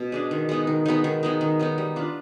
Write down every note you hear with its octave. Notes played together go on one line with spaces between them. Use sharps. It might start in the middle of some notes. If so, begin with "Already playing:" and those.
Already playing: B2
G#3 D4 G#4
D#3
G#3 B3 D#4
D#3
G#3 B3 D#4
D#3
G#3 B3 D#4
D#3
G#3 B3 D#4
G3
D4 F4 B4